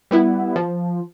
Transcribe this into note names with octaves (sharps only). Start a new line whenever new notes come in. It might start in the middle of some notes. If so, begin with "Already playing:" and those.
G3 B3 E4
F3